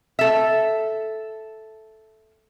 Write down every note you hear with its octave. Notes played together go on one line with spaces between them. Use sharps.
A4 E5